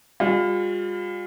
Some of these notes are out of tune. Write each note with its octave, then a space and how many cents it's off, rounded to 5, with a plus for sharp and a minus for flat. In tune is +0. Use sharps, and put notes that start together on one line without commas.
G3 +40 F4 +35